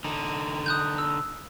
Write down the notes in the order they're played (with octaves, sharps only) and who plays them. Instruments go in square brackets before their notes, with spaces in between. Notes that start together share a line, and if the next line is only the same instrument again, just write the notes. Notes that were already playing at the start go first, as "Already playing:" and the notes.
[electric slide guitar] D3 D#4
[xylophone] D#6 F#6 G6
E6